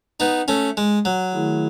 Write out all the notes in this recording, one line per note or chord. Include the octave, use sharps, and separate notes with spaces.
B3 D#4
A3 C#4
G#3
F#3
D#3 A3 E4 G#4